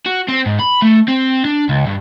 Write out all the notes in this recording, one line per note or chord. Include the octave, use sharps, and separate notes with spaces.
F#4
C4
G#2
B5
A3
C4
D4
C#2
G2